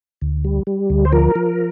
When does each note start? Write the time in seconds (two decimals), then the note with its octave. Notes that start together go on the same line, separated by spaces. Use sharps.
0.22 D2
0.45 G3
0.67 G3
0.90 D2
1.05 C5
1.13 F3 A#4
1.36 F3